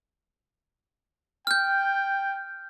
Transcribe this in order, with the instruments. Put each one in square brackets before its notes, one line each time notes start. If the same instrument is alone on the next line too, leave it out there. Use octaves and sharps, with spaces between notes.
[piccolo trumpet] G5 [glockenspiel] F6 G6